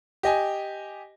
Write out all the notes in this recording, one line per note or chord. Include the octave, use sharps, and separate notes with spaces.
G4 D#5 G#5